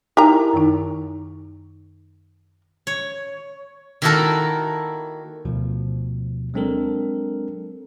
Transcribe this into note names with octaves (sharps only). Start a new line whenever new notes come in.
D#4 E4 G4 A#4 A#5
F#2 D#3 D#4
C#5
D#3 A#3 E4 F#4 A4 A#4
D2 B2 F3
F#3 G#3 C4 D4 A4 A#4